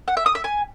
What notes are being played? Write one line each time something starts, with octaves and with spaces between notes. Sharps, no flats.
F#5
E5
D#6
E5
G#5